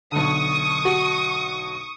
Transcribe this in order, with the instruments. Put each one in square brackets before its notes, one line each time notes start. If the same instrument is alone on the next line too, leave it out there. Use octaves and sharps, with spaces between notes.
[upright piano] B1 D3 [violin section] C#6 D#6
[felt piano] F#4